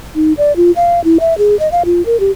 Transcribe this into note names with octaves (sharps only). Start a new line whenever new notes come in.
D#4
D5
F4
F5
E4
E5
G#4
D#5
F5
F4
A#4
G4